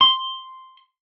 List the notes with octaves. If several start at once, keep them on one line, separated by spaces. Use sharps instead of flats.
C6